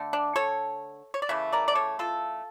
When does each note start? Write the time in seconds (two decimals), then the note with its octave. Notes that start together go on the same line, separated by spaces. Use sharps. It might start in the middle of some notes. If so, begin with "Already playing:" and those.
Already playing: D3 A3
0.13 D4
0.36 A4 C#5
1.14 C#5
1.22 D5
1.29 C#3 E3 A3 C#5 E5
1.53 A#4 D5
1.68 D5
1.75 A4 C#5
1.99 F4 A4